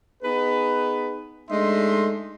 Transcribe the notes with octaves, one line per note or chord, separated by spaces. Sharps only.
B3 D#4 G#4 B4
G#3 A3 D4 D#4 E5 C6